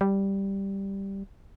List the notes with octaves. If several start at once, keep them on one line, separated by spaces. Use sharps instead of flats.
G3